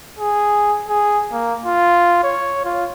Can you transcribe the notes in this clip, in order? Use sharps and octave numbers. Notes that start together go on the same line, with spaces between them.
G#4
G#4
A#3
F4
C#5
F4